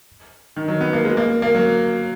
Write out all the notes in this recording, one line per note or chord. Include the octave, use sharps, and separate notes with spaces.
D#3
F#3
B3
A#3
G#3
A#3
A#3
F#3